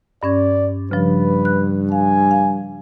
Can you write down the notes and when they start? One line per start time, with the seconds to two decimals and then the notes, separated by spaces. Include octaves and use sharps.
0.23 G2 C#4 D5 G#6
0.91 G2 C#3 F3 B4
1.45 F#6
1.92 F5 G#5
2.31 F5